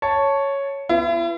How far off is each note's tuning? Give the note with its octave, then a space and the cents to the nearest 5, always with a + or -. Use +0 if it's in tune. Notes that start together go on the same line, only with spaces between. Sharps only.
C#5 +0 A5 +0
B3 +0 E4 +40